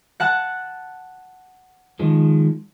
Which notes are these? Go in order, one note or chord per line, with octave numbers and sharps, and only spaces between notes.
F#5 A5 F#6
D#3 F3 G#3